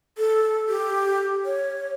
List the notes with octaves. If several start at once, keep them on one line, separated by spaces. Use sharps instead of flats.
A4
G4
C#5